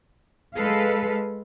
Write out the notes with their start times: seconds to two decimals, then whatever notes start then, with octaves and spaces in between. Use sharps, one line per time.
0.54 G#3 A4 B4 F5